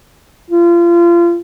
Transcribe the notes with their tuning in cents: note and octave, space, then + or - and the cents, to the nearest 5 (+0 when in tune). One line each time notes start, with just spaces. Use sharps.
F4 -30